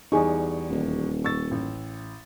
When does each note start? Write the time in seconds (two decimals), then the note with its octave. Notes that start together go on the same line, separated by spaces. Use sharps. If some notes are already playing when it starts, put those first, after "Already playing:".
0.12 E2 G3 D#4 G#4 C#6
0.70 D#1
1.24 C#6 E6 A6
1.51 A1